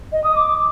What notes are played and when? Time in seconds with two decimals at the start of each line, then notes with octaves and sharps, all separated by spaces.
0.12 D#5
0.24 D#6
0.35 D6